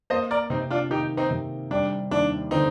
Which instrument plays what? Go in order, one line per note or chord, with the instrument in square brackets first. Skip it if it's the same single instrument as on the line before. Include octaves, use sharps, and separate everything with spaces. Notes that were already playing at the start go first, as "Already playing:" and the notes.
[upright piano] A#3 [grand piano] C5 D#5
[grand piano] A#4 D5
[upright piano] C3 [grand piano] C4 D#4
[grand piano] D4 F4
[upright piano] D#3 [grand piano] D#4 G4
[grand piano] C4 D#4
[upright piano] C3
[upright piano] G3 [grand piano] D4
[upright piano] D#2 [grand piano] D4
[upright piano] D3 [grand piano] C4 D#4